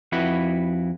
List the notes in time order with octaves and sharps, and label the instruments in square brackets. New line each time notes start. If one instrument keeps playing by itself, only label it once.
[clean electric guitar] F2 E4 F#4 B4